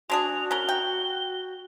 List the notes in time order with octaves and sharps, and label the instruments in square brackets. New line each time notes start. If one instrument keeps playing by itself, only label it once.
[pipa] G#3 D4 G#4 [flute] F#4 [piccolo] F7
[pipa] C#4 A#4 [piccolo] G7
[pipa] G5